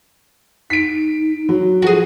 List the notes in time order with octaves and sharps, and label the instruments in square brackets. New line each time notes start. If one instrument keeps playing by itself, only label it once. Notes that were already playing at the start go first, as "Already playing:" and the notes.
[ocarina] D#4 [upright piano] B6 D7
[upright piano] F#3
[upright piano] F3 [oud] F#4 G#4 [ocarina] A4